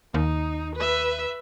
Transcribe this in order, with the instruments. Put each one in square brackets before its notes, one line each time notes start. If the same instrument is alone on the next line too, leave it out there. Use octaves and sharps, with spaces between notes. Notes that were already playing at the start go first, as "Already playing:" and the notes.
[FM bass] D#2 [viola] D#4
[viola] B4 E5